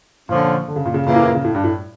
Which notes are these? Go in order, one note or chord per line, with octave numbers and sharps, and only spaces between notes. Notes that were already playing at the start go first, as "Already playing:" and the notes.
A#2 D3 F3 C#4
D3
C#3
A#2
C#3
A#2 C#3 E3 A#3
A2
A#2
C#3
A2
G2
A2